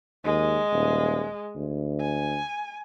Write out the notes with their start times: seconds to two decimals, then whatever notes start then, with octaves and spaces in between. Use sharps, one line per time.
0.25 D#2 G#3
0.72 D#1
1.55 D2
2.00 G#5